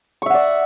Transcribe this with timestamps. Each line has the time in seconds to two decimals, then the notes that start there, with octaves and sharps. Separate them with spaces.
0.22 C#6
0.26 E5
0.30 F#5
0.34 D5